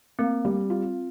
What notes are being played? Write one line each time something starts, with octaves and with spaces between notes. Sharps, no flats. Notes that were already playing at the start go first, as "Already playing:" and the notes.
A#3 C4
G3
F4